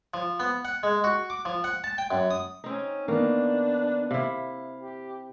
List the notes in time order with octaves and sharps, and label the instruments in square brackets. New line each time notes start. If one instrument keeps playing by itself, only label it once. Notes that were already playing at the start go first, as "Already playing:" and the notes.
[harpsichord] F3
B3
F#5
G#3
F#4
D6
F3
F#5
A5
G5
F#2
D#6
[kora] C4 D#4 [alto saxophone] C#4
[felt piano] D#3 B3 [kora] A#3 [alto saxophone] D4
[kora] C3 E4 [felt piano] F5
[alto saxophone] G4